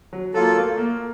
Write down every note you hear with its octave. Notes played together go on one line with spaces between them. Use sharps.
F#3
F#3 A#3 F4 A4
A3
A#3